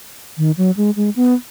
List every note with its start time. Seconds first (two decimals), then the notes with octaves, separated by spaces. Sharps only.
0.38 D#3
0.57 F#3
0.77 G#3
0.96 G#3
1.16 B3